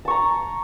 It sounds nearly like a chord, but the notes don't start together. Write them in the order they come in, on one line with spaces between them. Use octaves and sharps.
A5 C#6 A#5